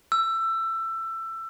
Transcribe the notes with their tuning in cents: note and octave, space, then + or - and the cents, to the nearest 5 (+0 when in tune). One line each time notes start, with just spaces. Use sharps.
E6 +20